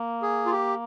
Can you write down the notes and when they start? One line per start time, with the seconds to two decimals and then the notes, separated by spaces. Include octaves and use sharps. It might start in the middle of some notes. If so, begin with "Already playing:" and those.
Already playing: A#3
0.22 G#4
0.46 F4
0.51 G4